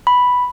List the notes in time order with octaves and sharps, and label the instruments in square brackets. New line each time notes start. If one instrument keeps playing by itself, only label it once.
[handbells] B5